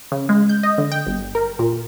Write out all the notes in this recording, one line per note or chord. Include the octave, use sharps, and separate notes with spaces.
C#3
G#3
G6
D#5
D3
G5
G1
A#4
A#2